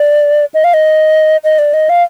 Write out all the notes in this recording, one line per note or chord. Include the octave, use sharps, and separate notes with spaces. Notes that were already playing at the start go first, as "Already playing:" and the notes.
Already playing: D5
D#5
F5
D#5
D#5
D5
D#5
F5